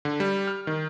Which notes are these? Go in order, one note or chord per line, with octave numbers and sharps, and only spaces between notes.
D3
G3
F6
D#3